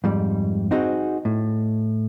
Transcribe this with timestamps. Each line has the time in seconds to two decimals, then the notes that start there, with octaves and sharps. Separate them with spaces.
0.04 F2 G#2 G3
0.71 C4 D#4 F#4 G#4 C5
1.25 A2